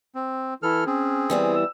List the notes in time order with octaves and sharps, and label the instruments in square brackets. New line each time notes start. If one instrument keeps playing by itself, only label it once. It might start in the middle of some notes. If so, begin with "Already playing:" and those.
[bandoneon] C4
[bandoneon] E3 A4 F6 [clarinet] E4
[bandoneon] C4 G#4 [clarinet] C#4
[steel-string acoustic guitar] E3 G3 B3
[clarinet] E6